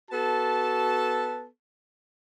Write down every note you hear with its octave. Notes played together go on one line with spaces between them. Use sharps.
B3 F#4 A4 A5